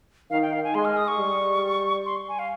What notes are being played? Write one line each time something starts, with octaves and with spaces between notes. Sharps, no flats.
D#3 F5
G5
F5
G#5
G#3 C6
F6
D#6
C#6
G3
C6
G#5
F5